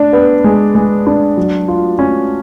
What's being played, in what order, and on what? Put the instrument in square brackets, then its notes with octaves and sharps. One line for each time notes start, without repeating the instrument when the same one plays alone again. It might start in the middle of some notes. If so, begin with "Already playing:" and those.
Already playing: [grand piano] D4
B3
G#3
G#3
D4
F#3
F4
C#4